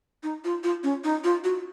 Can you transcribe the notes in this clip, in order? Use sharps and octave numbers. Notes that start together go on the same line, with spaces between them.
D#4
F4
F4
C#4
D#4
F4
F#4